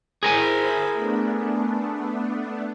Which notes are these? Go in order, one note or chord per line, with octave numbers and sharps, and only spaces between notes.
E4 G#4 A#4 C5 G#5 B5
A3 B3 D4